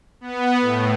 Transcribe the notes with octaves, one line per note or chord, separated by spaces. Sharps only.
B3
A2